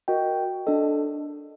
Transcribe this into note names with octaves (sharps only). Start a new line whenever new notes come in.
F#4 A#4 D#5 G5
D4 A4 D#5